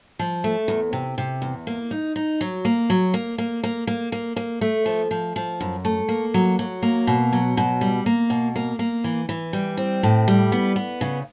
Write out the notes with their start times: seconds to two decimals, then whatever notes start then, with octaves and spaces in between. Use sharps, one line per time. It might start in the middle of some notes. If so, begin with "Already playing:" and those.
0.19 F3
0.44 A3
0.68 E2
0.93 C3
1.18 C3
1.42 E2
1.67 A#3
1.91 D#4
2.16 D#4
2.41 F#3
2.65 A#3
2.90 F#3
3.14 A#3
3.38 A#3
3.63 A#3
3.87 A#3
4.12 A#3
4.36 A#3
4.61 A3
4.86 F3
5.11 F3
5.36 F3
5.61 F#2
5.85 A3
6.08 A#3
6.34 F#3
6.59 F#3
6.82 A#3
7.07 B2
7.32 F#3
7.57 B2
7.81 G3
8.06 A#3
8.30 B2
8.56 A#3
8.79 A#3
9.04 E3
9.29 E3
9.53 G3
9.77 C4
10.03 A2
10.28 G3
10.52 B3
10.76 B3
11.01 C#3